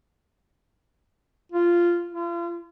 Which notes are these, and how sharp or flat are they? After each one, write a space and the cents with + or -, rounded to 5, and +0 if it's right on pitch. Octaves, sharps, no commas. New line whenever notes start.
F4 -10
F4 -40